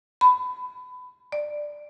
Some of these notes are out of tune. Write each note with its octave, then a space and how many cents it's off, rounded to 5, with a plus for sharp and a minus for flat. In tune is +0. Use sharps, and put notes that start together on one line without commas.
B5 +25
D5 +5